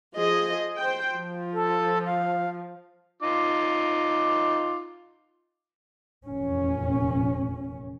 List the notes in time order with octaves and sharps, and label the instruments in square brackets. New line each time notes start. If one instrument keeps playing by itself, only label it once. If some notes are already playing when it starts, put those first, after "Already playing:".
[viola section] F3 G#4 D#5
C5 G5
F3
[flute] A4
F5
[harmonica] D#4 F4 D6
[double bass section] F1 E2 A#2 C#4